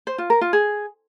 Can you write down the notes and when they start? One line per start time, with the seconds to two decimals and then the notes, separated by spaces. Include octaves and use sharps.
0.07 C5
0.18 F4
0.30 A#4
0.41 F4
0.53 G#4